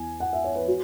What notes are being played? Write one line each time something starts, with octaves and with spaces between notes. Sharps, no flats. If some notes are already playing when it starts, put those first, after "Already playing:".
Already playing: E2 E3 G#5
F#5
E5
C#5
B4
F#4